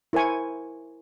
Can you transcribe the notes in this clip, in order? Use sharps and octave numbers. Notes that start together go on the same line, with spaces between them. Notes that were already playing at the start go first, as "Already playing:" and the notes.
E4 A#4 C5 G#5 C#6